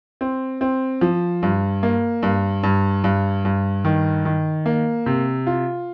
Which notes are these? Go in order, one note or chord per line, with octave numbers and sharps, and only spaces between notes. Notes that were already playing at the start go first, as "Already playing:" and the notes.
C4
C4
F3
G2
A#3
G2
G2
G2
G2
D#3
D#3
A#3
C3
F4